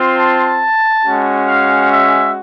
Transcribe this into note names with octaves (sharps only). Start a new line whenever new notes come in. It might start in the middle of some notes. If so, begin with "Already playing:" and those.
Already playing: C4 F4
A5
G#3 C#4 F#4
F5
E5